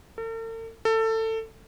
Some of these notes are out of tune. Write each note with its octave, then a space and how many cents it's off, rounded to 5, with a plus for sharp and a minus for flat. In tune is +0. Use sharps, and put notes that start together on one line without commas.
A4 +45
A4 +20